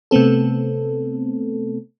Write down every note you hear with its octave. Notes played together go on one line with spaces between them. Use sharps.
C3 A3 B3 C4 A4